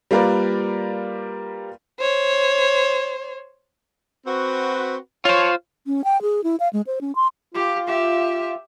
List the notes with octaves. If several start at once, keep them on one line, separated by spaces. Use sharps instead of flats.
G3 A#3 F4 A#4 B4 D5
C5 C#5
C4 F#4 B4
F4 C5 C#5
C#4
G5
G#4
E4
F5
G#3
C5
C#4
C6
F4 G4
G4 E5